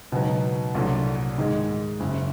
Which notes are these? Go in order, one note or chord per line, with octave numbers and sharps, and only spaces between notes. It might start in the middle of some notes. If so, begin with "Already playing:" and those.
C#2 B2 F#3 B3 D#4
C2 A#2 F#3 A3 D4
G#2 D#3 G#3
F#1 F#2 C#3